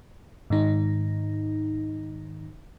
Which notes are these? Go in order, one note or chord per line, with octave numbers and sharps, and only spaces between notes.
G#2 D#3 D#4